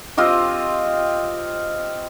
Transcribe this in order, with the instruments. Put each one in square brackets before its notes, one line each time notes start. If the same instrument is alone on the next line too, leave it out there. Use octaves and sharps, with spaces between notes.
[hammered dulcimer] C4 F4 G4 D#5